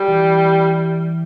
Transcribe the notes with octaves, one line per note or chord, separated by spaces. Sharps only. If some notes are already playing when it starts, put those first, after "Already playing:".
Already playing: G3
E3